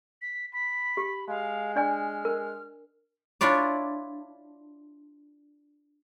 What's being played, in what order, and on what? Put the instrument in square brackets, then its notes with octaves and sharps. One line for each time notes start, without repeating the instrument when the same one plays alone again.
[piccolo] B6
[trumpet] B5 [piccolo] B6
[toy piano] G4
[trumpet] G#3 [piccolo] F5
[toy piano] D4 D5 G#5 [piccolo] F6
[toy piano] A#4
[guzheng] D4 E4 F4 C#5 D5